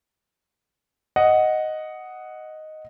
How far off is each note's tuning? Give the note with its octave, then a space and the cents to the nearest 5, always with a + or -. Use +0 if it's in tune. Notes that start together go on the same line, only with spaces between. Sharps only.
D#5 +0 F#5 +0